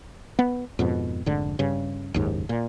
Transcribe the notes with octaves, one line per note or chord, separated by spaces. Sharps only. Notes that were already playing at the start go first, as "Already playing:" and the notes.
B3
F2 G#2 B2
F1 G#2 D3
G2 C#3
F#1 D#2 G#2
A#2